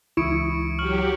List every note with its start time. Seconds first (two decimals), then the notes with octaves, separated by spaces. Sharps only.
0.17 C#2 E3 E4 C#6 D#6 C#7 D7
0.79 F#3 G4 C#6 F6 F#7